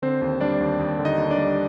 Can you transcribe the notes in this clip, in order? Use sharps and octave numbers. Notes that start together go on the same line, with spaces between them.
D3 C4 C5
D#2
G3 D4 D5
D#2
D#2
D3
D#4 D#5
D#2
D4 D5
G3